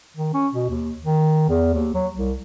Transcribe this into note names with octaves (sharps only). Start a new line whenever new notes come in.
D#3
C#4
B2
D#2
D#3
E2
D#2
F#3
C2